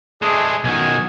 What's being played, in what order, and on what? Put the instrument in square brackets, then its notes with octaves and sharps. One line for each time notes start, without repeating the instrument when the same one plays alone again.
[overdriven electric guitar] G#3 D4 [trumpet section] A3 G#4
[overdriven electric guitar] B1 D#3 [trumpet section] F#4 D#5 G#5